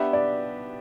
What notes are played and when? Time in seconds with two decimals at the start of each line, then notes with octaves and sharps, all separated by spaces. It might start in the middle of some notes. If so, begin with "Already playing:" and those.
Already playing: B3 D4 G4 B4 E5
0.13 D5